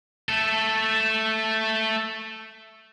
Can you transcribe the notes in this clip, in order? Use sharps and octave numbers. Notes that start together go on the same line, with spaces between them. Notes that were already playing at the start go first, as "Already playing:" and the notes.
A3 A4